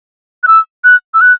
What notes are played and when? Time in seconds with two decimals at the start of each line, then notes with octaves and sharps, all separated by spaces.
0.43 F#6
0.48 E6
0.84 F#6
1.14 E6
1.21 F#6